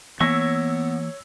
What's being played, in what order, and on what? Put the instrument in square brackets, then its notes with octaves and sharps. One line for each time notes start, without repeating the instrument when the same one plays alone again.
[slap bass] E3 A#3 [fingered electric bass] B3 [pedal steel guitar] C#5 C#6 [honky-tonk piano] E6 A#6 B6